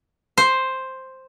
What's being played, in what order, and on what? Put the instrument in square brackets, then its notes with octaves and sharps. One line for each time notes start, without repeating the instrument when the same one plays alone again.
[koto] C5